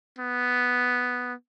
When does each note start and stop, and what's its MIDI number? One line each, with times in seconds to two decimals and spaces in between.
0.18 1.34 59